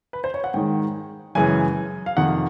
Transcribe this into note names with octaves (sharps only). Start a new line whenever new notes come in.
B4
C5
C#5
F#5
G#2 D#3 G#3 G5
F#2 C#3 E3 G#3 G#5
F5
F2 C3 D#3 F#5